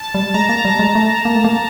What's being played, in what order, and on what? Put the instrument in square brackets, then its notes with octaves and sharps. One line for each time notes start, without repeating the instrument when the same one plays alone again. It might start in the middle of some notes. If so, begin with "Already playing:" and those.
Already playing: [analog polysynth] A5
[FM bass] G3
[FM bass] G#3 [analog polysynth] A#5
[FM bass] A#3
G3
G#3
A3
A#3
A3
A#3